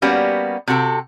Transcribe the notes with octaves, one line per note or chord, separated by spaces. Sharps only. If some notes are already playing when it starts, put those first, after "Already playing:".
G3 A#3 B3 C#4 F#4 G4
C3 F#4 A4 G5